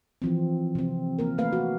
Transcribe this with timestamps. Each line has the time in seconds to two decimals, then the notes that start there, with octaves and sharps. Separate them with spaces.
0.22 E3 F3 C4
0.75 C3 C4
1.19 A#3 A#4
1.38 A3 A#3 B4 F5
1.53 F#4